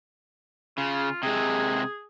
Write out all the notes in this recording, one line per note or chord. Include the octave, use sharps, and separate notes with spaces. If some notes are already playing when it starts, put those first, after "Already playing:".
C#3 F4
C3 G#3 G#4